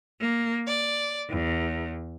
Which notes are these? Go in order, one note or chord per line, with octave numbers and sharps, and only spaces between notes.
A#3
D5
E2